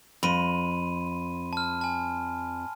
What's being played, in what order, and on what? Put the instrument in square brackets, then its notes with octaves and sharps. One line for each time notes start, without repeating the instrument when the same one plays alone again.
[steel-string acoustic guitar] F2 [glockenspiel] B5 C6 D#7
[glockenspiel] A5 F6
G#5 A5